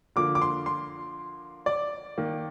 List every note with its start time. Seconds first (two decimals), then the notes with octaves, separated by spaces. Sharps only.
0.16 D3 F3 A#3 D6
0.35 D6
0.42 C6
0.66 C6
1.66 D5
2.18 D#3 A#3